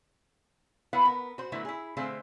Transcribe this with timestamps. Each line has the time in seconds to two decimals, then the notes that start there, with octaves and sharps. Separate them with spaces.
0.93 B3 E4 B4 F5 F#5
1.05 B3 A#4
1.38 F#4 C5
1.52 D3 F#3 A3 B3 E4
1.65 E4 G#4
1.97 D3 A3 C4 G#4 C5 F5